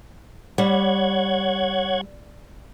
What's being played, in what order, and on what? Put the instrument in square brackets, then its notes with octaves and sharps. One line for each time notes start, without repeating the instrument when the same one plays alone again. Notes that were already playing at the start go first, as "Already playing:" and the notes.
[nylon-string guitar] G3 [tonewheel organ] C#5 F#5 G#6